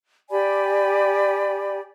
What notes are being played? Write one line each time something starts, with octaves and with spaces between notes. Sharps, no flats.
G4 D5 G#5 B5